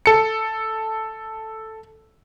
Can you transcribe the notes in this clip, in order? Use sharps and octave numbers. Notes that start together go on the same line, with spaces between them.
A4 C#7